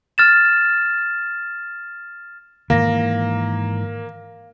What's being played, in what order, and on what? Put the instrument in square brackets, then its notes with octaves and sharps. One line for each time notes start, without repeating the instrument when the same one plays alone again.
[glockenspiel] F6 A6 E7
[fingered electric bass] G#2 D#3 E3 [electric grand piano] A#3 [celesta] F5 A#6